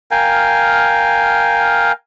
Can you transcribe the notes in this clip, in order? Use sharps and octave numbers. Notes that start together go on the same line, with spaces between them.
A#4 F5 G5 G#5